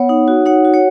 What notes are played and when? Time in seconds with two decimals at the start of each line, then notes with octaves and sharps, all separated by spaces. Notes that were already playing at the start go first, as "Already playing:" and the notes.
Already playing: B3 C#5 F#5
0.09 D#4
0.28 F#4
0.45 D#4 C#5 F#5
0.65 F#4
0.74 C#5 F#5